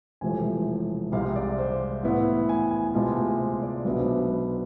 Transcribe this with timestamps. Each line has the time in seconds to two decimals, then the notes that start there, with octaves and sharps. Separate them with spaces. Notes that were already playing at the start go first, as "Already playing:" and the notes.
0.21 E1 E2 C3 F3 A3 G#5
1.12 C2 C3 G#3 F5
1.36 D5
1.58 C5
2.03 A2 E3 B3 E4
2.49 G#5
2.71 G#5
2.94 D2 C3 G#3 B3 F4 A5
3.16 G#5
3.40 C5
3.62 D5
3.85 B1 B2 B3 D4 E5
4.00 C5
4.15 B4
4.31 B4